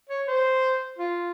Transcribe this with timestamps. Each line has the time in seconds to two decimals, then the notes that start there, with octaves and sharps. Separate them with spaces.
0.09 C#5
0.27 C5
0.98 F4